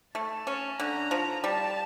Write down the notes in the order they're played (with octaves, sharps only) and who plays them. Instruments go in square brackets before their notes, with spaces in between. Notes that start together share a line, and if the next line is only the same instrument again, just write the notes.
[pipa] A3 [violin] A5
[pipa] C#4
[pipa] D3 [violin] A#5
[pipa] F3
[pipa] G3 [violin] A5